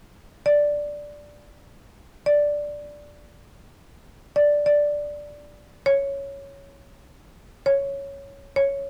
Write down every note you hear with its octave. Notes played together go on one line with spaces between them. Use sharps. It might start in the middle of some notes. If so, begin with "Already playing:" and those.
D5
D5
D5
D5
C#5
C#5
C#5